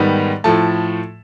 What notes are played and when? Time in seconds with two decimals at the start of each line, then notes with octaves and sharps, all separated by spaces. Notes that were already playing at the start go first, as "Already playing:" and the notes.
Already playing: G#2 D#3 G3 B3
0.44 A2 F3 A3 A5